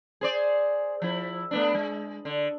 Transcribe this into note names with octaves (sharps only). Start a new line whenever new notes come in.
G#4 C5 D5
F3 E4
A3 B3 D4
G#3
D3